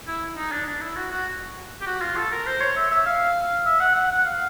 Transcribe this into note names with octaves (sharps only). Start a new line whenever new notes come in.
E4
D#4
D4
D4
E4
F#4
F#4
G4
F#4
F4
A4
A#4
C5
C#5
E5
E5
F5
E5
F#5
F#5
F#5
F5